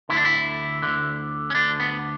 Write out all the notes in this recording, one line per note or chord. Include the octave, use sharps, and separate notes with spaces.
D2 D3 E4
D4
E4
D2 D3
C#4
D2 D3 D4
B3